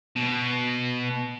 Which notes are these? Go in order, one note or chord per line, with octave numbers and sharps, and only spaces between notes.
B2